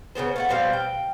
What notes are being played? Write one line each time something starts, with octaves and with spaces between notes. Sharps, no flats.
C#3 G3 B3 C5
A3 F5 F#5
B2 G3 C4 F5
G5